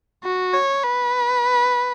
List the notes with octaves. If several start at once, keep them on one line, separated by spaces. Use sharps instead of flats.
F#4
C#5
B4